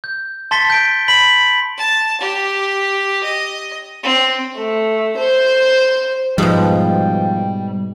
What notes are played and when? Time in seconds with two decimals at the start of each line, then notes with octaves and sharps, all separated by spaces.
0.04 G6
0.51 A5 C6 A6 B6 C#7 G7
0.70 G6 D7
1.08 B5 B6 F#7
1.78 A5
2.21 G4
3.24 D#5
4.03 C4
4.57 A3
5.17 C5
6.38 G#2 B2 F3 G3 G5